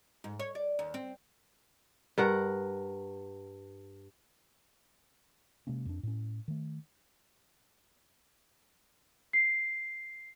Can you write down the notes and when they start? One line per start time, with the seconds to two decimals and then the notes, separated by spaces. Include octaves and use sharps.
0.24 G#2
0.40 C#5
0.55 D5
0.79 D#2
0.94 C4
2.18 G2 A#4 F#5
5.67 C3 G#3 A#3 C#4
5.86 F2 D4
6.03 A2 C#4
6.48 D#3 A3
9.33 C7